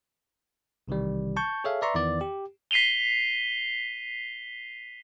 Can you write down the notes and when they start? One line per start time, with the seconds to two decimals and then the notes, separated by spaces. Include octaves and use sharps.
0.88 B1 C3 D#3 E3 G3
1.36 A5 C#6 G6
1.64 G#4 A4 C#5 E5 F5
1.82 B4 D5 E5 A#5 C6 C#6
1.94 E2 D#3 E3 B3 E4 D5
2.21 G4
2.71 B6 C7 D#7 F7 G7